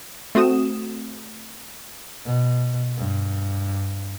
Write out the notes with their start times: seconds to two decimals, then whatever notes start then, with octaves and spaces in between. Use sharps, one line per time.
0.35 A3 C4 F#4 D#6 E7
2.25 B2
2.97 G2